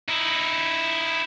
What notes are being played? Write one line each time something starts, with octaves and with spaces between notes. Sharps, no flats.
D#4 E4